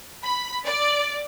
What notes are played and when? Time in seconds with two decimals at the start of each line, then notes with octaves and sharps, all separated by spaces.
0.23 B5
0.66 D5